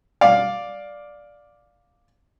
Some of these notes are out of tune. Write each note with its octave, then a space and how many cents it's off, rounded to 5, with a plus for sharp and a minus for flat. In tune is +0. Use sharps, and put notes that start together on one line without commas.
D5 +0 F5 +10